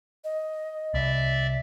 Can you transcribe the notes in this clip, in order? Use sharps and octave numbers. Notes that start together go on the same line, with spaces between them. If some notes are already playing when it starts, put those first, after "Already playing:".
D#5
C2 D5 E5